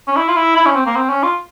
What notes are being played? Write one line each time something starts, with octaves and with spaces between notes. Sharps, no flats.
C#4
E4
F4
E4
E4
C#4
C4
A#3
C4
C#4
F4